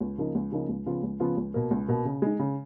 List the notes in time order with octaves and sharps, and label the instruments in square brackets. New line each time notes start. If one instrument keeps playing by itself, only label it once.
[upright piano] C#2
C#3 F3 A#3 D#4
C#2
C#3 F3 A#3 D#4
C#2
C#3 F3 B3 F4
C#2
C#3 F3 B3 F4
C#2
B2 A#3
C#2
B2 A#3
C#3
G#3 D#4
C#3